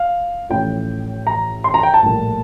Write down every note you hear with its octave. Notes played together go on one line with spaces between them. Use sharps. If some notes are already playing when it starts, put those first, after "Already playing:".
Already playing: F5
A1 A2 F3 G5
A#5
C6
A#5
G5
A5
A#1 A2 G3 A#3